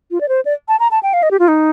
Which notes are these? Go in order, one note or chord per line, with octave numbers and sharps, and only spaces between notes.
F4
D5
C5
D5
A5
A#5
A5
G5
F5
D#5
G4
F4
D#4